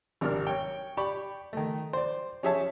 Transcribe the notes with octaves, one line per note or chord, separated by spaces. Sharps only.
G#1 C3 D4 A#4 F6
C#5 G5
G4 D5 B5 C#6
D#3 A3
C5 D5
C#4 G4 G#4 C#5 E5 A5